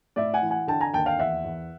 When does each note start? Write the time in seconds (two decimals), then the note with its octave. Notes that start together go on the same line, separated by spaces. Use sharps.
0.16 A2 D5 E5
0.34 F#5 G#5
0.42 E3
0.50 F#5 G#5
0.67 D3 G5 A5
0.81 G#5 A#5
0.93 D#2 G5 A5
1.06 F5 G5
1.19 E2 E5 F#5
1.44 E2